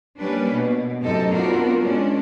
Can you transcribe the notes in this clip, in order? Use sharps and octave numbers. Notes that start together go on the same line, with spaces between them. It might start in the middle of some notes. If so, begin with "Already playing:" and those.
G3 A#3 C#4 D4 B4
B2
F#2 C3 A3 D#4 A4
B3 C4 D4 F4 F#4 A#4
G#3 C#4 D4